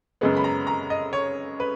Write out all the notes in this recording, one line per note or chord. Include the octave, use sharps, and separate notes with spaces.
F#2 C#3 G#3 B3
B5
A#5
A#5
D#5
C#5
B4